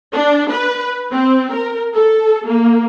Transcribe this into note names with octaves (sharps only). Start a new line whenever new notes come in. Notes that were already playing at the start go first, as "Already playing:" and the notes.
D4
B4
C4
A#4
A4
A#3